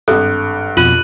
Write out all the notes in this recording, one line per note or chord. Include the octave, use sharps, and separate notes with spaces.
G#1 G2 A4 F#6
F2 B2 F4 F#6 D#7 F#7